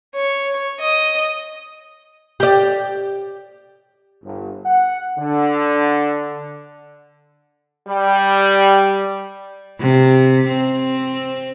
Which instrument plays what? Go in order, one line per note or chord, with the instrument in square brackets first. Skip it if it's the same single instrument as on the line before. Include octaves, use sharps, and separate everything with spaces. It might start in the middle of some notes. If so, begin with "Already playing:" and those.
[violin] C#5
D#5
[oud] G4 D5
[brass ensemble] G1
F#5
D3
[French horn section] G3
[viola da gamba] C3
C4